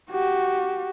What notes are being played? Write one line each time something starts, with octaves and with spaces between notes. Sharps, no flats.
F#4 G4